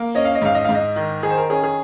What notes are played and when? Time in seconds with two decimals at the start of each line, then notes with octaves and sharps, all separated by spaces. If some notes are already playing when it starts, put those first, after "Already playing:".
Already playing: A#3
0.15 C#4 D#5
0.25 F5
0.35 D#5
0.42 G#2 F5
0.55 D#5
0.65 G#2 F5
0.75 D#5
0.96 D#3
1.23 D#3 G#4
1.30 C5
1.37 A#4
1.50 C#4 G#4
1.64 G#4